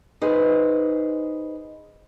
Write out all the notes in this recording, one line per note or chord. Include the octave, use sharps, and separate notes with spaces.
D#4 G#4 B4 C5